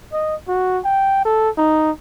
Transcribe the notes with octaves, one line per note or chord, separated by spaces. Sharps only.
D#5
F#4
G5
A4
D#4